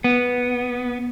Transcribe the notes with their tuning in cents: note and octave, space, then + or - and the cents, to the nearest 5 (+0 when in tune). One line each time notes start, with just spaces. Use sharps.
B3 -5